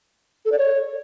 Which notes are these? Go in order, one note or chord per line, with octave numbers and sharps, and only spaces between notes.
A4
D5
C#5